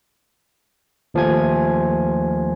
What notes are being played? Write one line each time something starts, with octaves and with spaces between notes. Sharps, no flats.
D#2 F3 A3 G#5 G#6